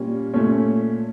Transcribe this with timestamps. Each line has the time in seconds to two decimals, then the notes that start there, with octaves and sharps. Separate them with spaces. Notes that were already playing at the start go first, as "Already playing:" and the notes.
Already playing: A#2 G3 A#3 C#4
0.34 A#2 A3 C#4 C#5